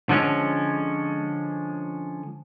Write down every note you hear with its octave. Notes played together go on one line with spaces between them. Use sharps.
D3 F3 G#3 C#4